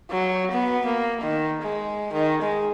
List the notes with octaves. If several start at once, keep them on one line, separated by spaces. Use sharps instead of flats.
F#3
B3
A#3
D#3
G#3
D#3
G#3